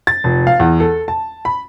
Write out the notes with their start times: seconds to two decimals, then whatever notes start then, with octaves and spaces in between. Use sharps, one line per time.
0.07 A6
0.24 F1
0.47 F5
0.60 E2
0.80 A4
1.08 A5
1.45 B5